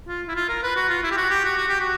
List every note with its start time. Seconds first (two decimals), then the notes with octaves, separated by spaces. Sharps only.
0.08 F4
0.28 E4
0.36 F4
0.49 A#4
0.63 B4
0.76 F#4
0.90 F4
1.03 E4
1.11 G4
1.17 F#4
1.30 G4
1.44 F#4
1.57 F#4
1.69 G4
1.81 F#4